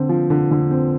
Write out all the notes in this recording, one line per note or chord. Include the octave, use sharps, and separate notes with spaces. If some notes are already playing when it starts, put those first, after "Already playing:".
Already playing: D3 C4
F3
D3
D3
C4